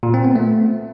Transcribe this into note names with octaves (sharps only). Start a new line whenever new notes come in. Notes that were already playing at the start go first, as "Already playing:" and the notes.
A#2
C4
B3
A3